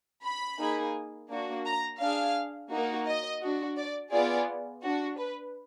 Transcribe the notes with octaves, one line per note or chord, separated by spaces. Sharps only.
B5
A#3 D#4 G#4
A#3 D4 F#4
A#5
D4 G#4 F5
A#3 D#4 F#4
D#5
D4 F#4
D5
B3 F4 G#4 D5
D4 F#4
B4